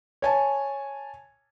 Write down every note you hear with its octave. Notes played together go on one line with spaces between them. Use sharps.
C#5 G#5 A5